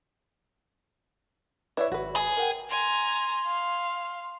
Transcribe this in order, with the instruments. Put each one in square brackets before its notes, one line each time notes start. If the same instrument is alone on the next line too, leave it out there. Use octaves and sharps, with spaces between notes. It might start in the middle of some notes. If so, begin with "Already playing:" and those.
[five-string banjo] E4 C#5 [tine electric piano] B4 D5 E5
[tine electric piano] G#1 [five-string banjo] F#4 B4
[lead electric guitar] G#4
[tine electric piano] A#4 F#5 G5
[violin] G#5 A#5 [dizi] C6
[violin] F5